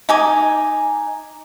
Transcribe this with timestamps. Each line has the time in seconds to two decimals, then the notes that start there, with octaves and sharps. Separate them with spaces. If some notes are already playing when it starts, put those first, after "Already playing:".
0.09 D#4 G#5 D6